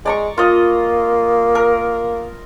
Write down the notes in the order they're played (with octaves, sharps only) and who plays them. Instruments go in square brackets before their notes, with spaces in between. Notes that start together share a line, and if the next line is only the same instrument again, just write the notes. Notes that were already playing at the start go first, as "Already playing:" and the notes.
[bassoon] G#3 [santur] D5 A#5 C#6
[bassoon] A#3 [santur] F4 D#5
[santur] A#4